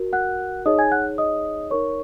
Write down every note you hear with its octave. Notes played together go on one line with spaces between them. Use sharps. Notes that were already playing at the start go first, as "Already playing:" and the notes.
Already playing: F#4 A#4
F#5 F#6
D#4 G#4 C#5 D#5 D#6
G#5 G#6
F#5 F#6
D#5 D#6
D#4 A#4 C#5 C#6